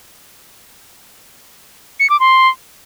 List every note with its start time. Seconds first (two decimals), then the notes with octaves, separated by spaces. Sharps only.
2.00 C#7
2.10 D6
2.20 C6